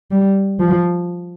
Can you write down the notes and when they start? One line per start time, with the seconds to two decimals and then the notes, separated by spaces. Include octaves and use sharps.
0.11 G3
0.60 F3